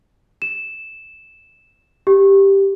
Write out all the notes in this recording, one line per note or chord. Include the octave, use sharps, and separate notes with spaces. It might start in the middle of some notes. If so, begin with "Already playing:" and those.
E7
G4